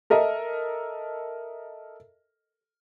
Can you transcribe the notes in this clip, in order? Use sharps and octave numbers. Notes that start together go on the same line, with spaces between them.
A4 A#4 D#5 E5